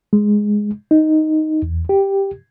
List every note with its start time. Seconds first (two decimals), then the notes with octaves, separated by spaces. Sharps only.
0.13 G#3
0.91 D#4
1.62 E2
1.89 G4